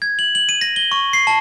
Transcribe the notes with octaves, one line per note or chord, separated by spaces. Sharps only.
G#6
F#7
F#7
D#7
A#6
G7
C#6
C7
A5